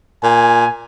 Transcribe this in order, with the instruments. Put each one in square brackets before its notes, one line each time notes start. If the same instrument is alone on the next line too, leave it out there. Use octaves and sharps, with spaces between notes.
[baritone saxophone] A#2 [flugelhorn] G#5